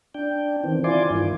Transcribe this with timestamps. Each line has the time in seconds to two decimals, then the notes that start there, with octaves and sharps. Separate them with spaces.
0.14 D4 G5
0.64 D#3 E3 C4
0.84 E4 F4 D5 G#5 C6 D6
1.10 G2 D#3